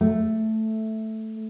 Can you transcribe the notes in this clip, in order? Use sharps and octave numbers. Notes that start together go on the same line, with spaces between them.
A3